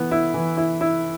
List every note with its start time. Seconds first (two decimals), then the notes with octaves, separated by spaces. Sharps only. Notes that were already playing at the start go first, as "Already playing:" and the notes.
Already playing: E3 B3
0.11 E4
0.34 E3
0.57 E4
0.81 E4